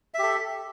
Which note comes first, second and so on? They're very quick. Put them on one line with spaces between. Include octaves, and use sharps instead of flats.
E5 G4 A4